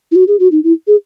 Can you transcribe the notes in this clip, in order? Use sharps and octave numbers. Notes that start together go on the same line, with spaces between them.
E4
F#4
G#4
F#4
D#4
E4
G#4